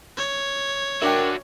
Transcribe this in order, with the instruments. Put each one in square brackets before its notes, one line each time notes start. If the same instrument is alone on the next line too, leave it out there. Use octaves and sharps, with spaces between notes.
[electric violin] C#5
[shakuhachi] D4 [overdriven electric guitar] F#4 E5 [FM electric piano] A#4 G5